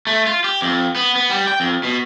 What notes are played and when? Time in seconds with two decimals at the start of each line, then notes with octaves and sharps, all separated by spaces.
0.07 A3
0.27 F4
0.44 G4
0.62 F2
0.96 B3
1.16 B3
1.30 G3
1.48 G5
1.60 F2
1.83 B2